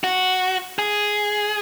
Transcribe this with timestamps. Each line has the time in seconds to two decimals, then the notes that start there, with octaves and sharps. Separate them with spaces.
0.04 F#4
0.79 G#4